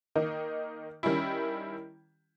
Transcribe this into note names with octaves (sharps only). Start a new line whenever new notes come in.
D#3 A#3 D#4
D#3 G3 C#4 E4